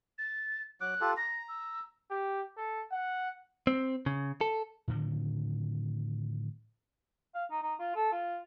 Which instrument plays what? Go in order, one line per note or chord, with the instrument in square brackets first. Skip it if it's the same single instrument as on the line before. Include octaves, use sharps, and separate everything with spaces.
[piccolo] A6
[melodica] F#3 D6 [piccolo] F#6
[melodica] F4 G4 A4
[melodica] A#5 [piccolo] A#6
[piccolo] E6
[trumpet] G4
A4
F#5
[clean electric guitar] C4
C#3
A4
[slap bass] A2 D3 D#3 F3
[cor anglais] F5
D#4
D#4
F4
A4
F4